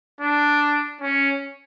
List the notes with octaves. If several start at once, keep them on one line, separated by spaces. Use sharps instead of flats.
D4
C#4